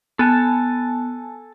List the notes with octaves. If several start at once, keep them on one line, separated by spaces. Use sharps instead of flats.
B3 A4 G#5 A5